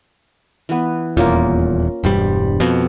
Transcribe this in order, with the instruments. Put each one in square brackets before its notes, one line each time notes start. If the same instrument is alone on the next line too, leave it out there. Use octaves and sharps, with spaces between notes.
[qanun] E3 B3
[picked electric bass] D#1 E2 [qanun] A#3 C#4 F4
[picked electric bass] E1 G2 G3 [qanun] C5
[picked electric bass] F2 B2